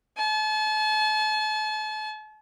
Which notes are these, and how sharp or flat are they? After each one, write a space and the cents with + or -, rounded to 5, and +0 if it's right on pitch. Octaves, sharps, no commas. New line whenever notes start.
A5 -40